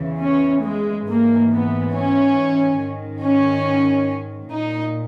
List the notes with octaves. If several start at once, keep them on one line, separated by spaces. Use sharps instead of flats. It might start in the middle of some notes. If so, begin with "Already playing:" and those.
Already playing: E2 C#3 E3
C#4
G#3
G#2 E3 A#3
B3
C#4
G#2 D#3
C#4
A#2 D#4